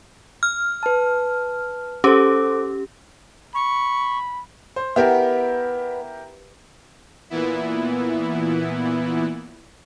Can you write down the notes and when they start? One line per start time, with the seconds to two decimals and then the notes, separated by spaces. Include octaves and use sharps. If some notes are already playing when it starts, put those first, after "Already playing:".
0.43 F6
0.83 B4 A5
2.04 C#4 G4 A4 C5 D6
3.55 B5 C#6
4.76 C5
4.96 B3 E4 G4 A#4
7.30 A#2 E3 B3 E4